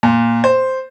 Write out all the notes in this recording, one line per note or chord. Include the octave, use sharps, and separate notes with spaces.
A#2
C5